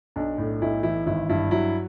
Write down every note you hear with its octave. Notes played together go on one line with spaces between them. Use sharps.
B1 D4
A2
B1 E4
E3 E4
G#1 E4
G2 E4
F#3 E4